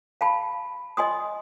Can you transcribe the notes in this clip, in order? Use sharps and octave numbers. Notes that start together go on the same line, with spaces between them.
F5 A5 B5
D#5 G#5 C6 D#6